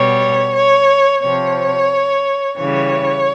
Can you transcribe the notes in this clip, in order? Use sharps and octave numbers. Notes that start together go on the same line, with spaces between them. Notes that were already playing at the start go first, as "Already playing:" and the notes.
Already playing: B2 G3 C#5
C#5
C3 F3 C#5
C#3 E3 G3 C#5